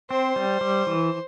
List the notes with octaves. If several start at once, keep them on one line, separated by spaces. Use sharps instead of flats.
C4 C5
G3
G3
E3